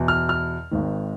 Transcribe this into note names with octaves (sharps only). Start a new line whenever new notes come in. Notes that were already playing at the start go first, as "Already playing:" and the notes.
Already playing: E2 B2
F6
F6
G#1 G#2 D#3